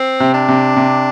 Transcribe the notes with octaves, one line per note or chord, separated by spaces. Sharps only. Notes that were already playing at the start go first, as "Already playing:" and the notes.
Already playing: C4
C3
D4
C3
C3